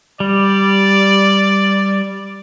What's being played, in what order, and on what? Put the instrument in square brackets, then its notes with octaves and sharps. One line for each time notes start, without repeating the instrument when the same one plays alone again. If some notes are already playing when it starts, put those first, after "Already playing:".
[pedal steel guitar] G3 [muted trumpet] D5